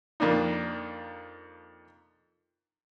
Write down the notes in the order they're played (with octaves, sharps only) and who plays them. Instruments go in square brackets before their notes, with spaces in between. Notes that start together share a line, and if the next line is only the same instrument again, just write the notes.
[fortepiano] F2 A#3 D4 D#4